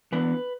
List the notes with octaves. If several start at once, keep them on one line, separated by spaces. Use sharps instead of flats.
E3 B3 D4 B4